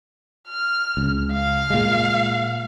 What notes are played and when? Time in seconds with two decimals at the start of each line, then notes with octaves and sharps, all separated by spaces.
0.48 F6
0.97 C#2
1.32 F5
1.70 A#2 G#3